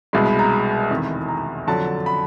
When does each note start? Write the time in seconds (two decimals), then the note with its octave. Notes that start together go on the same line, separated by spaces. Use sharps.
0.13 C2 B2 G#3 B5
0.26 B5
0.39 A#5
0.53 B5
0.90 F1 E2 C3 D#3
1.28 A#5
1.67 F2 D3 F#3 A5
2.06 B5